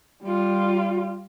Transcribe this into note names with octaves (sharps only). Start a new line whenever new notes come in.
G3 F4